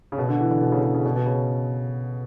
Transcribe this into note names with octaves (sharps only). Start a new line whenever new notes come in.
C#3
B2
D3
E3
D3
B2
C#3
C#3
C#3
B2
B2
C#3